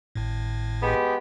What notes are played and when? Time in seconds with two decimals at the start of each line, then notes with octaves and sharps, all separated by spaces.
0.15 G#1 A2
0.82 G#3 B3 G4